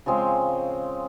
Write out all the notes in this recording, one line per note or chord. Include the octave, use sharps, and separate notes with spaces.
C#3 F3 G#3 C4